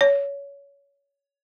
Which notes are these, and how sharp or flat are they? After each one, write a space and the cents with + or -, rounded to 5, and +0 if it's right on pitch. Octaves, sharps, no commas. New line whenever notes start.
C#5 +20